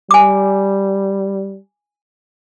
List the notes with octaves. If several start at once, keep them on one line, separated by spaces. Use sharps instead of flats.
G3 G#5 D6